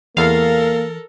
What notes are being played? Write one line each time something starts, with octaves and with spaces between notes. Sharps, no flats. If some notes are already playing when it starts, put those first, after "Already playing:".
E2 E3 A#3 A4 A#4 F5